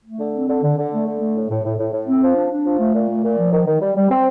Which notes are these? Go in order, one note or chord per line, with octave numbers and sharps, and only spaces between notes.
A3
D3
C4
D3
D3
D3
A3
D3
A3
A2
A2
A2
A2
A2
C4
F3
D4
D4
F3
A3
A#2
A3
A#2
F3
D#3
D#3
G3
G3
C4